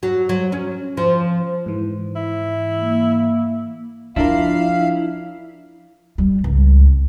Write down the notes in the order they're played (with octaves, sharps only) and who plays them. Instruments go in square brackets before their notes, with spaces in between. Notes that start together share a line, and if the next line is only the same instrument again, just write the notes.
[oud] F#3
F#3
C#4
F3
[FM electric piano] G#2 E3
[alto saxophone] E4
[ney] A#3
[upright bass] F3 [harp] D4 F4 A#4 [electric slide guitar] E4 [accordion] F5
[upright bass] G3
C#2